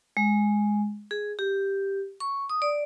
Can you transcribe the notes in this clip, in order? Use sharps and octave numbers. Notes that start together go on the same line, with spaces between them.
G#3
G#4
G4
C#6
D#6
D5